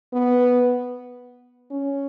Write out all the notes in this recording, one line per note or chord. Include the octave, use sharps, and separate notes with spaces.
B3
C#4